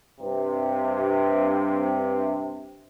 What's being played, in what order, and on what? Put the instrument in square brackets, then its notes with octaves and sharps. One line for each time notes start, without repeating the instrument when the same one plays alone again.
[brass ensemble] G2 C3